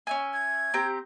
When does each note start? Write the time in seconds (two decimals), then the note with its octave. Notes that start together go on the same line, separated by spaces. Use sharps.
0.07 C#4 E5 G#5
0.33 G#6
0.74 C4 G4 A#5